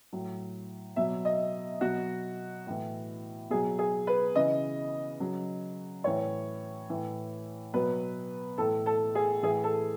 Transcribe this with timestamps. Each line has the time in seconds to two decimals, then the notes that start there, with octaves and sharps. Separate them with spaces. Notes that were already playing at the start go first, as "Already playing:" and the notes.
0.13 A2 F#3
0.96 B2 F#3 E5
1.25 D#5
1.81 B2 F#3 F#4
2.67 A2 E3
3.50 B2 F#3 G#4
3.79 G#4
4.07 B4
4.35 C#3 E3 D#5
5.20 C#3 F#3
6.04 A2 E3 C#5
6.90 A2 E3
7.73 B2 F#3 B4
8.58 A2 E3 A4
8.86 A4
9.15 G#4
9.43 A2 E3 G#4
9.63 A4